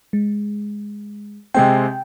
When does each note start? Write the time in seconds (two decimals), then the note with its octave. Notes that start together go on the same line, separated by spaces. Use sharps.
0.13 G#3
1.54 C3 G#3 C4 G5